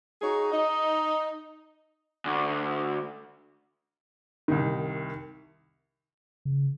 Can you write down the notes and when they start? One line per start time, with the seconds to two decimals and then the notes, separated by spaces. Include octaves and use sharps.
0.22 D#4 F#4 G#4 C#5
0.51 D#4 D#5
2.25 D2
4.48 C2 D#3
6.45 C#3